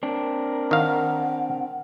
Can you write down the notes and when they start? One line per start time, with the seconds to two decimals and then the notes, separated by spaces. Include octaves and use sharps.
0.03 C4 D4 A#4
0.71 D#3 F5 F#5